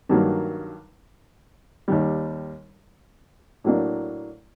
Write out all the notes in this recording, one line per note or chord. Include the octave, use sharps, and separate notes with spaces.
G2 D#3 F#3 A#3
D#2 D#3 G3
A2 F#3 A#3 D4